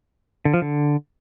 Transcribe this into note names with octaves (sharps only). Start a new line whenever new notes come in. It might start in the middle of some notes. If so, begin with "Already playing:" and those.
D3
F3
D3